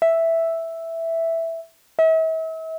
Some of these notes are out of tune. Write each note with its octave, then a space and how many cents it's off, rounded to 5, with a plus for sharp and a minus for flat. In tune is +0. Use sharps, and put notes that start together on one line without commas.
E5 +0
E5 -40